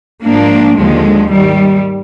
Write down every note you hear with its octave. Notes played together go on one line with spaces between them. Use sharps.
G#2 F3 A#3 D4
D#2 D3 F3 G#3
G#2 D#3 G3